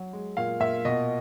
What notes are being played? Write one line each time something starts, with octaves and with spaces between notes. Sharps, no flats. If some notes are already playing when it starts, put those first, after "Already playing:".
Already playing: F#3
G#3
A#2 F5
A#2 E5
B2 D#5